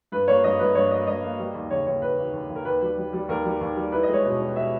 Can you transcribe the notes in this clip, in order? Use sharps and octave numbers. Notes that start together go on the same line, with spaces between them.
G2 B4
A#3 C#5
G2 D#5
G2 B4
G2 C#5
A#3 D#5
G2 D#5
A#3
G3
D#2
C#3 C#5
D#2 C#5
D#2 B4
D#2
D#2
D#2
A#4
D#2 B4
G3
G3
G3
D#2 A#4
G3
D#2
G3
E4 B4
D#5
G#3
C#5
B2
C#4
B2 E5